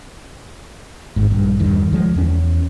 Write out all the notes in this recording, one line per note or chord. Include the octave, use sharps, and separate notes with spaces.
G#1 G#2
A#1 G2
E2 G2 D#3
D2 F3 G#3
E2 C#4